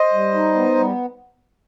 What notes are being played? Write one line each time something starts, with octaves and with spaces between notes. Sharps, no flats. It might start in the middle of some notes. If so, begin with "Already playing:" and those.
Already playing: C5 D#5
G3
D#4
B3
G3